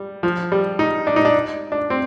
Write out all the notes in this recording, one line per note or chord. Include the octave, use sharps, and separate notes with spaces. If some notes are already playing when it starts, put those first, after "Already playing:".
Already playing: G3
F3
G3
D#4
D4
D#4
D4
D4
C4